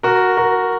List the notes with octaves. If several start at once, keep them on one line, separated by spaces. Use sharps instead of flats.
F#4 A#4
F#4 A#4